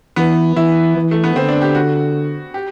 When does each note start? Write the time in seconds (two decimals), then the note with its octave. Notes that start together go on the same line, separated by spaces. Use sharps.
0.16 E3 B3
0.56 E3 E4
0.96 E3
1.11 A3
1.24 B3
1.36 D3 C4
1.48 D4
1.62 G4
1.75 F#4
2.54 G4